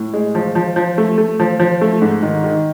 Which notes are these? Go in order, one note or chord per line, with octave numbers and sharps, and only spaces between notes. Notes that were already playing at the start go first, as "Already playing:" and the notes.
Already playing: A2
G#3
F3
F3
F3
A3
A3
F3
F3
A3
G#2
D#3
D#3